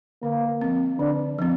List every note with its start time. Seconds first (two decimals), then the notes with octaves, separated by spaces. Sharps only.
0.23 D3 A#3
0.61 F3 C4
1.00 D3 D4
1.38 F3 C4